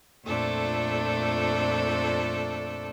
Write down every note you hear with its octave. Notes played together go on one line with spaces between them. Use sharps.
F2 A#2 A3 D4 A4